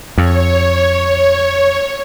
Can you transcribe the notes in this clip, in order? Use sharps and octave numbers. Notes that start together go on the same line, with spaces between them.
F2 C#5